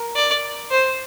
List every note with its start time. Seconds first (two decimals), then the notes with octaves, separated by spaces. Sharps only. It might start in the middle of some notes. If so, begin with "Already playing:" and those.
Already playing: A#4
0.15 D5
0.71 C5